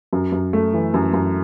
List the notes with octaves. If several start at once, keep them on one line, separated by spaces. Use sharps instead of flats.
F#2
F#2
A3
E3
F#2
F#2